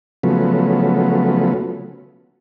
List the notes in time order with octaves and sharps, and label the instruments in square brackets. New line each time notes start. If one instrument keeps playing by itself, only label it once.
[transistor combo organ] C#3 F3 F#3 A3 B3